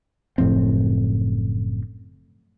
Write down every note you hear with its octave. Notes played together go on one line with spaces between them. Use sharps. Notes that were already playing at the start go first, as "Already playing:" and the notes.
F#1 A2 F3 C4